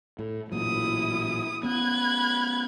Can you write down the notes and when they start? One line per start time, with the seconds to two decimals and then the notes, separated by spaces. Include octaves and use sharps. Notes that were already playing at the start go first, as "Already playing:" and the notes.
0.19 A2
0.52 A1 A#2 F#3 E4 D#6
1.63 B3 C#4 B5 F#6 G#6